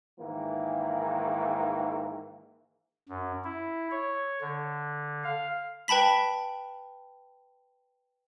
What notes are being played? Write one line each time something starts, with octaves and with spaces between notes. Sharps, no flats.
G#2 D#3 E3 A#3
F#2
E4
C#5
D3
F5
B4 G5 A5 B5 B6